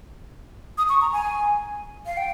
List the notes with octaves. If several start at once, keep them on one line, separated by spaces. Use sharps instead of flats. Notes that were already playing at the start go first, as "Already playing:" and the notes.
D#6
C#6
A#5
G#5
F5
G5